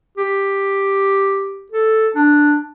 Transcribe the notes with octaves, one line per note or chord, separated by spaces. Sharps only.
G4
A4
D4